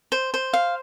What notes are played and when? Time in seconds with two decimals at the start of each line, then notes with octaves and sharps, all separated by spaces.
0.12 C5
0.34 C5
0.53 F5